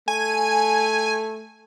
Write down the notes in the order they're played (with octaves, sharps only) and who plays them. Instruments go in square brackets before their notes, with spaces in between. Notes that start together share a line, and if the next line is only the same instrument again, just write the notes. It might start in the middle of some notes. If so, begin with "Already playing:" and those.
[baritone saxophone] A3 [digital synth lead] G#5